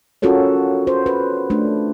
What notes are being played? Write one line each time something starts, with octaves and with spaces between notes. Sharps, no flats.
C#4 F4 F#4 A4 A#4 C#5
C5
B4
A3 D4